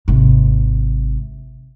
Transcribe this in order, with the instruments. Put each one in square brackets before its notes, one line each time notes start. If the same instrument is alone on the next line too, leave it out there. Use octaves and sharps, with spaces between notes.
[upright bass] G#1 C3